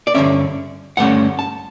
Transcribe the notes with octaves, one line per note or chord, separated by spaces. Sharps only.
D5
G2 D3 A3 C#4 E5
G2 D3 A3 C#4 F#5
A5